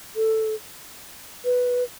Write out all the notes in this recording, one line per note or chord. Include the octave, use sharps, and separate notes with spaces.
A4
B4